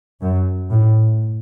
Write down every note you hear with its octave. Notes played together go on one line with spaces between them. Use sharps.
F#2
A2